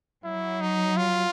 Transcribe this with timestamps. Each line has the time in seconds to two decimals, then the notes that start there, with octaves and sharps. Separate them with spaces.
0.24 F#3 E4
0.61 D#4
0.97 F4